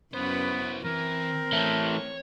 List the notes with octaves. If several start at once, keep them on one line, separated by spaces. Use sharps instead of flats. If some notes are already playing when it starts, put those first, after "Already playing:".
F#2 B3 E4 F#4 B4 C5
E3 C4 A#4
E3 A3 C#5